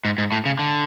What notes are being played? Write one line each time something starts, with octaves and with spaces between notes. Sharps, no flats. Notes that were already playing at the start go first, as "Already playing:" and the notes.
G#2
G#2
A2
C#3
D3